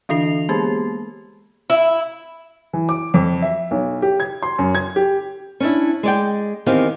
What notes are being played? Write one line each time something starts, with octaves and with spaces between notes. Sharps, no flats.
D3 E3 D4 A4 C7 F7
G#3 A#3 B3 G4 G#4
E4
E3
D6
F2
E5
B1
G4
G#6
C6
F#2
G#6
G4
C#4 D4 E4
G#3 D5 G5
E2 D#3 C4 G4 F5